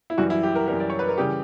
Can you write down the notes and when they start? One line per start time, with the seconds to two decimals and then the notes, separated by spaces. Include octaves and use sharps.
0.10 E4
0.18 F#2 E3 G3 F#4
0.30 E4
0.43 G4
0.55 A#4
0.68 F#2 E3 G3 A#4
0.80 D5
0.90 C#5
0.99 B4
1.08 A#4
1.18 C#3 E3 G3 G4